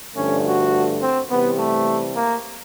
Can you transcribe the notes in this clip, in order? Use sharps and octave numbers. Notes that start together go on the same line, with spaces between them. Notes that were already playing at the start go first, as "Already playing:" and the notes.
G2 D3 F3 A3 C#4
F#4
C4
C3 E3 G3 B3
A3
A#3